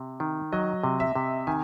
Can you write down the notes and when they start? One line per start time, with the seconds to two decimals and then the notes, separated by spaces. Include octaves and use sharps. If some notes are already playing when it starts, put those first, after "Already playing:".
Already playing: C3
0.20 D#3
0.52 F#3 D#5
0.84 C3
1.00 E5
1.15 C3
1.47 D#3 G#5